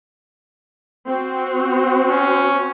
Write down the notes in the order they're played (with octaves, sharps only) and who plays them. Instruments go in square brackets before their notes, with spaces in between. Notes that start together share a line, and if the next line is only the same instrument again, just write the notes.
[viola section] C4 F#4
[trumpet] C#4